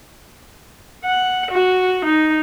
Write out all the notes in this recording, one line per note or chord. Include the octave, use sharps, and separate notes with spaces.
F#5
F#4
D#4